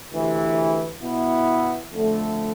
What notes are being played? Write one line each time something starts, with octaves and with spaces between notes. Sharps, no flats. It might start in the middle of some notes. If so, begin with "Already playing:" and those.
D2 C3 E3
B2 B3 E4
F2 D3 A3